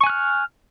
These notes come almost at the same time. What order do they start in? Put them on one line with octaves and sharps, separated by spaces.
C#6 G#5 F#6 F6